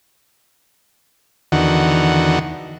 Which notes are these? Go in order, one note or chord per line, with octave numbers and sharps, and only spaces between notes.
E2 D3 D#3 F#4